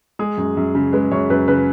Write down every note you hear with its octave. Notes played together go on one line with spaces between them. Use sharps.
G#3 G#4
F#2
F#2
C#3
G#3 B4
F#2 C#5
F#2 B4
C#3 B4